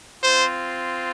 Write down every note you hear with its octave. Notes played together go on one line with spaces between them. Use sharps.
C4 F4 C5